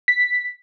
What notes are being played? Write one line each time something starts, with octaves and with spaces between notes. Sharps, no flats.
B6